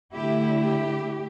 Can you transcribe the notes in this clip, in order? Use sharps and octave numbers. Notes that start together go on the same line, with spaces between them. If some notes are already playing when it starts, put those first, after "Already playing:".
D3 A3 E4 G4
G4